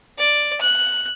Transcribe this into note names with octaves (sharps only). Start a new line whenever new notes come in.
D5
F#6